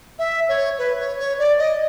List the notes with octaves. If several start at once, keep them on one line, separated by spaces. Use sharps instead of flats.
E5
C#5
B4
C#5
C#5
D5
D#5